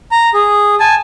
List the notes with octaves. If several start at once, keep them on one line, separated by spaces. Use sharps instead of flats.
A#5
G#4
G#5 A5